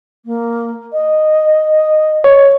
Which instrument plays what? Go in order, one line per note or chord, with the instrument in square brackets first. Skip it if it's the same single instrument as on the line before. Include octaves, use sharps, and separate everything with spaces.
[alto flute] A#3
D#5
[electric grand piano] C#5